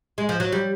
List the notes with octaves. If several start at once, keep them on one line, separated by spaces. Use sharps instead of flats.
G#3
F3
F#3
G3